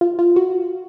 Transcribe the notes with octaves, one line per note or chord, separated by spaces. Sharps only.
F4
F4
F#4